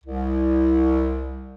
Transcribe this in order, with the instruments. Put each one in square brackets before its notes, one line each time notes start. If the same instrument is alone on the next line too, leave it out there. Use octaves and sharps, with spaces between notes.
[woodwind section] C2